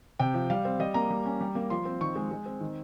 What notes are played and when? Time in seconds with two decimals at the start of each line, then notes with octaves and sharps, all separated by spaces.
0.19 C3 G5
0.34 F3
0.50 G3 F5
0.65 C4
0.79 G3 D#5
0.94 A#3 A#5
1.10 G3
1.25 C#4
1.41 G3
1.55 A#3
1.70 F3 C6
1.85 C4
2.01 D#3 C#6
2.15 G#3
2.31 G#3
2.46 C4
2.61 D#3